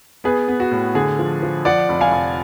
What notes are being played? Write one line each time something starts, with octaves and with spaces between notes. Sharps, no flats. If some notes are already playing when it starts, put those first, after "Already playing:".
B3 G#4 B4
B3
F#4
A2
D3 G#4
F3
F3
F3 D5 F#5
F1
F5 G#5
F1